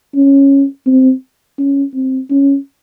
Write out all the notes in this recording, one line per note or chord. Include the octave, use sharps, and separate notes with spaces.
C#4
C4
C#4
C4
C#4